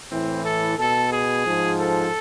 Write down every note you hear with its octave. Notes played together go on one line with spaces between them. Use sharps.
A2 E3 C4
A4
B2 A4
G#4
G#2 F3
A4